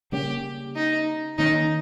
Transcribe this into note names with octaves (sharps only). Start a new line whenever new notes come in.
C#3 G3 A#3 C#4 G4
D#4
D#3 A#3 C#4 D#4